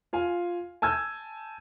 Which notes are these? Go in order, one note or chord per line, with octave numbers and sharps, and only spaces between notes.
F4 F5 G#5
G#5 A5 E6 G6 G#6